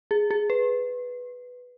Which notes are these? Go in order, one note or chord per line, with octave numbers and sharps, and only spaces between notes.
G#4
G#4
B4